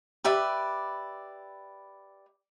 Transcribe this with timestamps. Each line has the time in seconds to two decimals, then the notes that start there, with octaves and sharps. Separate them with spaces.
0.24 G4 B4 D5 E5